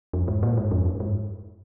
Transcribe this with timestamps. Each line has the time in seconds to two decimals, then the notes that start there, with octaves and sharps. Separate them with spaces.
0.13 F2
0.28 G#2
0.43 A#2
0.57 G#2
0.71 F2
0.85 F#2
1.00 G#2